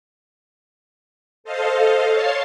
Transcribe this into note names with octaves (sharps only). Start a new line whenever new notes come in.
A4 C5 D#5 F5
C#5 F5 A5 C6